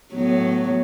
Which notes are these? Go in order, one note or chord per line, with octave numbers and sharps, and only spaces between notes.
A2 F#3 B3